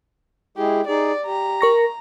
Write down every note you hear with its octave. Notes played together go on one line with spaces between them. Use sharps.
G#3 E4 G4 G#4
D#4 G#4 D5
G4 A#5
A#4 C#6 A#6